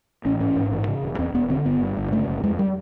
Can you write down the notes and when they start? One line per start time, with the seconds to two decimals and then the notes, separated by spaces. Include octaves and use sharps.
0.25 A1 C#4
0.40 G#2 C#4
0.56 G#2
0.71 A1
0.87 C#3
1.03 E1
1.19 E2 C4
1.34 E1 B3
1.50 D3 C4
1.65 G1 B3
1.81 G2
1.97 G1
2.12 C#3 A3
2.28 F#1
2.43 F2 G#3
2.59 G3